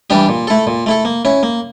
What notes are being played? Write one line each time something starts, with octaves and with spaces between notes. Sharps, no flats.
E3 G3 D4 G4
A#2
A3 E4 A4
A#2
A3 E4 A4
A#3
C#4 E4
A#3